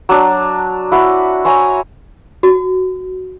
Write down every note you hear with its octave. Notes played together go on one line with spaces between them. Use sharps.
F#3 D4
E4 F#4 F#5
C5 C#5 G#5 A#5
F#4